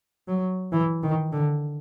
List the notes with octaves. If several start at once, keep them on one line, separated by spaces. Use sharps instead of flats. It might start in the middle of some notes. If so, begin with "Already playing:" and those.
F#3
E3
D#3
D3